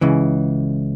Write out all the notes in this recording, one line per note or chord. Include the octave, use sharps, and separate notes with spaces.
C#2 C#3 E3